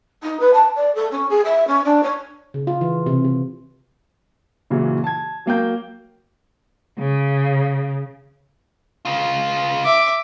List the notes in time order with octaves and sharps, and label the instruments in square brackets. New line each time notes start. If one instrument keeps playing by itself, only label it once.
[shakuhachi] D#4
B4
A5
D5
A4
C#4
G#4
E5
C#4
D4
C#5
[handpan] C#3
F4
E3
C3
C3
[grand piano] A#2 C#3 E3 F#3
A5 G#6
F#3 A#3 G5 G6
[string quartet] C#3
[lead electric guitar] C#3 F4
[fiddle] E5 D6